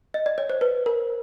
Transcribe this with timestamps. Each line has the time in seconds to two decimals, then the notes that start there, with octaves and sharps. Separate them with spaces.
0.14 D#5
0.26 D5
0.38 C#5
0.50 C5
0.61 B4
0.86 A#4